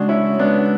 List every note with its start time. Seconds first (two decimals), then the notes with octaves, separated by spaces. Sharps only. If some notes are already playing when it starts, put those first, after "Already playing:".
Already playing: C#3 G#3 D4 F#4
0.09 C#4 E4
0.39 G#3 B3 D4